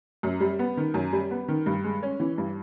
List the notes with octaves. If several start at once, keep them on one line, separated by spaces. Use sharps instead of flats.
F#2
G3
B3
D#3
F#2
G3
B3
D#3
G2
G#3
C#4
E3
G2